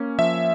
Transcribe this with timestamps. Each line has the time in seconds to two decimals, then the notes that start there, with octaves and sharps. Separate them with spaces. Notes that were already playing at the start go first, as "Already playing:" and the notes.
Already playing: A#3 C#4
0.18 F3 E5